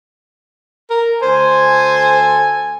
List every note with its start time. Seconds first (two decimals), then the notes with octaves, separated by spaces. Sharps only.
0.90 A#4
1.22 D2 A4 C5 G#5